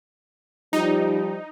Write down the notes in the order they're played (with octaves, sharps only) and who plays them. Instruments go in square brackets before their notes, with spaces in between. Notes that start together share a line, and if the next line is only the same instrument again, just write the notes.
[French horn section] F3 G3 [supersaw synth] D#4